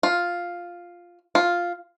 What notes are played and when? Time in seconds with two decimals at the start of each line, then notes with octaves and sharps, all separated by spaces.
0.03 F4
1.35 F4